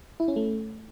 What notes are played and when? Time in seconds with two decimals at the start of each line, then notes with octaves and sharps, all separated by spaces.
0.20 E4
0.28 C#4
0.36 A3